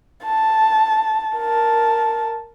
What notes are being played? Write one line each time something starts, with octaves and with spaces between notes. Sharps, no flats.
A5
A#4 A5